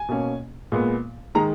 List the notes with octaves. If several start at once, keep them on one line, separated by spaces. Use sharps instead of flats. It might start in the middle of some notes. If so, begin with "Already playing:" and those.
Already playing: G#5
B2 A#3 C#4
A#2 G#3 B3
D#3 G#3 A#5